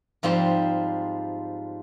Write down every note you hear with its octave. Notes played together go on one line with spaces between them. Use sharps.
G#2 F3 G3 C4 C5